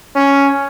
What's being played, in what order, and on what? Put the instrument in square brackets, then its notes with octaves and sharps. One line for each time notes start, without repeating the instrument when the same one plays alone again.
[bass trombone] C#4